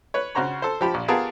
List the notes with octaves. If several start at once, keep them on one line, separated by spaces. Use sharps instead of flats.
B4 C#5
C#3 F#4 C5 A#5 C#6
A4 C5
F3 G4 B5
A#1
B3 F4 G4 G#4 A#4 A5